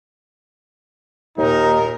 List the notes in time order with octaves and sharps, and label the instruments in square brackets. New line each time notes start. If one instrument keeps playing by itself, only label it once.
[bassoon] D#2 [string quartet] A#2 A#4 [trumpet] D#4